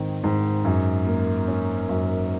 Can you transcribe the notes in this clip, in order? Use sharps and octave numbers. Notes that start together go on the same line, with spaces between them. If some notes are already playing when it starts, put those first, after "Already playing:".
Already playing: G#2 D#3 C4
G#2
F#2
A#3
C#4
F#2